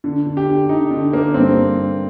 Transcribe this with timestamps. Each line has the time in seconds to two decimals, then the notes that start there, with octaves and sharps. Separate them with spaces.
0.04 D3
0.26 D3
0.37 G4
0.47 D3
0.69 D3 D#4
0.91 D3
1.13 D3 A#3
1.34 G2 C4